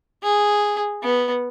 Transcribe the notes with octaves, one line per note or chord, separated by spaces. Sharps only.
G#4
B3